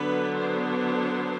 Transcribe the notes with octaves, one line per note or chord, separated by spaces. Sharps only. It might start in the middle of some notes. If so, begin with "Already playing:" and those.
Already playing: D3 F#3 B3 D4 B4
C5